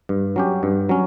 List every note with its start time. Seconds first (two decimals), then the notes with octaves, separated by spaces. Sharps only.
0.09 G2
0.36 F#3 C#4 G4
0.63 G2
0.89 F#3 C#4